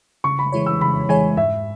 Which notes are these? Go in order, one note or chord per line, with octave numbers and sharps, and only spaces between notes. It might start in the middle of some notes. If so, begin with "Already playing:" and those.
C#3 C#6
B5
E3 G#3 E4 C#5
E6
C#3 B5
E3 G#3 E4 C#5 G#5
G#2 E5